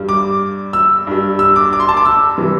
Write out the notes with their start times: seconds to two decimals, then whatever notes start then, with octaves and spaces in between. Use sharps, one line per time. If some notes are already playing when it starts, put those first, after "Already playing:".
Already playing: G2 G3
0.09 D6
0.73 E6
1.07 G2 G3
1.39 E6
1.56 D6
1.73 D6
1.80 C6
1.89 A5
1.97 D6
2.05 E6
2.38 C3 E3 G3